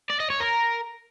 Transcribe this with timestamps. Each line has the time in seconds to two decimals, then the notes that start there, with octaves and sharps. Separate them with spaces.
0.10 D5
0.20 D#5
0.30 C#5
0.40 A#4